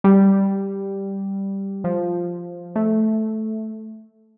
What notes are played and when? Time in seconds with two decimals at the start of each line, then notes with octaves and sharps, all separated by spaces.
0.04 G3
1.84 F3
2.76 A3